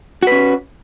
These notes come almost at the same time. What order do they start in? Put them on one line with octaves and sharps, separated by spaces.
F#4 B4 C#4